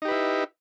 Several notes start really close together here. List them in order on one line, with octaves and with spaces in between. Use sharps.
D#4 G4 B4 E4